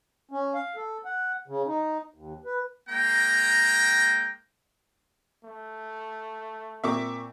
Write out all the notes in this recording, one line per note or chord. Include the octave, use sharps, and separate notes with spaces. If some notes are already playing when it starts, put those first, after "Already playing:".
C#4
F5
A4
F#5
C#3
D#4
D#2
B4
G#3 A#3 G5 A#5
A3
A#2 A#3 C4 E5 C#6 D6